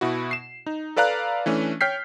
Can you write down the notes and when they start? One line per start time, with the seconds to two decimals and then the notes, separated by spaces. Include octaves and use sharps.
0.01 B2 E4 F#4
0.31 C7 E7
0.66 D#4
0.96 A4 B4 D5 F5 A#5 F#6
1.46 E3 A3 C#4 D4
1.81 C#5 G5 F6 G6 B6 C7